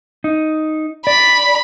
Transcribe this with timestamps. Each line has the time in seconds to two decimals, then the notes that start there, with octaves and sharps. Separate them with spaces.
0.24 D#4
1.07 D5 B5